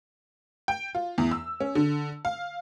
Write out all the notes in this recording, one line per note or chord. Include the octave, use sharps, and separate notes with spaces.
G5
F4
E2
E6
C#4
D3
F5